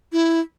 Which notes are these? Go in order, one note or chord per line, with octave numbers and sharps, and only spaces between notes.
E4